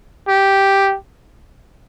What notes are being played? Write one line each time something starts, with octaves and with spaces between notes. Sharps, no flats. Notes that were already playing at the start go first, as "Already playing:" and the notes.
G4